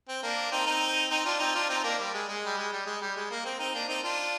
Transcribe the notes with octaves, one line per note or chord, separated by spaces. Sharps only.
C4
A#3 D4
C4 D#4
C4 D#4
C4 D#4
D4 F4
C4 D#4
D4 F4
C4 D#4
A#3 D4
G3
G#3
G#3
G3
G#3
G3
G#3
G3
G#3
A#3
C4
C4 D#4
A#3 D4
C4 D#4
D4 F4